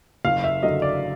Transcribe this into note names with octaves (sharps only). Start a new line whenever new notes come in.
F#1 F5
E5
F#2 D3 F#3 D#5
D5